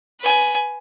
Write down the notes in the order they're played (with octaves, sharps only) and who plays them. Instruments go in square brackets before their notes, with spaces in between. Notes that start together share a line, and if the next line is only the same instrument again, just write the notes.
[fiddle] B4 G#5